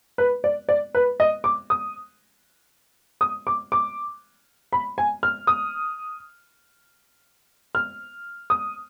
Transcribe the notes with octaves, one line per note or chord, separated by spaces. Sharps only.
B4
D5
D5
B4
D#5
D6
D#6
D#6
D6
D6
B5
G#5
F6
D#6
F6
D#6